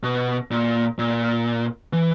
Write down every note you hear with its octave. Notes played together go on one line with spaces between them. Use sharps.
B2
A#2
A#2
E3